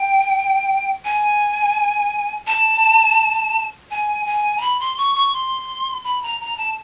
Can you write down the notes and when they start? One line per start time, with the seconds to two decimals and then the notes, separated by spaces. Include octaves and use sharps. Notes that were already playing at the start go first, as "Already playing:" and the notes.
Already playing: G5
1.05 G#5
2.47 A5
3.91 G#5
4.26 G#5
4.58 A#5
4.61 B5
4.80 C6
4.97 C#6
5.15 C#6
5.33 C6
6.04 B5
6.23 A#5
6.41 A#5
6.57 A5